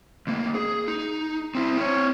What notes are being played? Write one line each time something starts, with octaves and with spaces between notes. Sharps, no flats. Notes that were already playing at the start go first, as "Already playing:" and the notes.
D2 A#3
G#4
D#4
C4 E4
C4 C#5